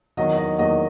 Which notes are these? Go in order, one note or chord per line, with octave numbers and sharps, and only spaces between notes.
E2 D#3 F#3 D#5
D#5
E2 D#3 F#3 D#5